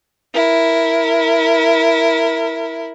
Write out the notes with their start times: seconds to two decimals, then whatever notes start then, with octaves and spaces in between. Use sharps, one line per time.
0.33 E4 A#4